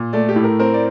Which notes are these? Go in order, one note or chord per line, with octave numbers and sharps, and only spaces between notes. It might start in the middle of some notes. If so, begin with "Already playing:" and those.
Already playing: A#2
A3 D5
G4
A2
A#4
C4 A#4
D5